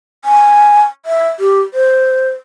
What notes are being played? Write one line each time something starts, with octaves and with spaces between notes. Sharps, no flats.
G#5
E5
G4
C5